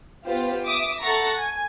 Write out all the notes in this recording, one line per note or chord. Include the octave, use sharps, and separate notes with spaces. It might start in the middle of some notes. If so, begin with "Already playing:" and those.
B3 F4 G4 C5
E5 D6 D#6
A4 F#5 A#5 C#6 A6 A#6
G#5